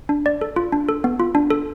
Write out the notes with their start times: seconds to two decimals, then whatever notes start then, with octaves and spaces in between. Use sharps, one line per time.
0.09 D4
0.26 D5
0.41 A4
0.56 F4
0.72 D4
0.89 A4
1.04 B3
1.20 F4
1.35 D4
1.50 A4